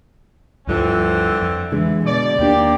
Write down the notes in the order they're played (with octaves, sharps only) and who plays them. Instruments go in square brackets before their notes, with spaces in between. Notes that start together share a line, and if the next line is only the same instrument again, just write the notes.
[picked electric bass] D2 G2 F3 [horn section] D3 E3 C4
[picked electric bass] F2
[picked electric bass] D3 G#3 [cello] E3
[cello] B2 [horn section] D5
[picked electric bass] D#2 D4 [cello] A#3 G4